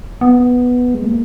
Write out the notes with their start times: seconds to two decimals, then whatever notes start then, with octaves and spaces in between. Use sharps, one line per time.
0.21 B3
0.94 G#3
1.04 A#3